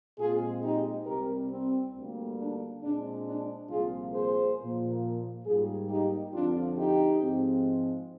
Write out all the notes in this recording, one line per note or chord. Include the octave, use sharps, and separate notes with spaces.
A#2 G#3 C4 F4 G#4
D#4 G4
C2 C3 G3 C4 G4 A#4
C4
D2 D3 G3 A#3
D4
A#2 G#3 C4 D4
D4
C2 A#2 F3 A#3 F4 G#4
G#4 C5
A#2 F3 A#3
G#2 G3 A#3 F4 G#4
D#4 G4
F2 D3 F3 C4 D4 F4
D#4 G4
G#2 F3 G#3 C4